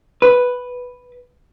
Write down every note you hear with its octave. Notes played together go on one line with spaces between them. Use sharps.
B4